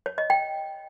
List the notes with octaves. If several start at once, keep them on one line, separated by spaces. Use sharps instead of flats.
C#5
D#5
G5